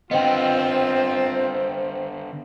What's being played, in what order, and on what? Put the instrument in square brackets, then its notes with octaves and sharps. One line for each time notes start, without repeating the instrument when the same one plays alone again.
[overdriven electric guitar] D3 B3 [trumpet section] C4 F4 [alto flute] C5 [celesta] D#5 G5